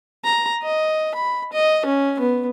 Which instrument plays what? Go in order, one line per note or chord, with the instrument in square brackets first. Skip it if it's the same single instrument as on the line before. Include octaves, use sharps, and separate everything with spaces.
[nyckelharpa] A#5
D#5
B5
D#5
C#4
B3